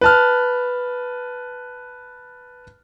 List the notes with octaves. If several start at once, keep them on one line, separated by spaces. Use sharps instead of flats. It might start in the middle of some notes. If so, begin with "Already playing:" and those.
B4 A5 F6